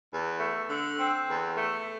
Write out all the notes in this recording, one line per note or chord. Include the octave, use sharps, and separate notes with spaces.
E2
A3
D3
C4
E2
A3